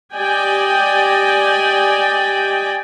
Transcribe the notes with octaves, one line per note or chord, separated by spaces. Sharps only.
G4 D5 D#5 G5 G#5